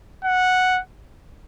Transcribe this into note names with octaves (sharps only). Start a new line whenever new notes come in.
F#5